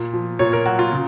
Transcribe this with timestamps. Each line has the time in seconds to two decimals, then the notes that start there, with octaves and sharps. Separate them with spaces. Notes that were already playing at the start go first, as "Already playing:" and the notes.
Already playing: A#2
0.13 F3
0.39 A#2 C#5
0.53 A#4
0.66 F#3 F#4
0.79 F4
0.92 C#3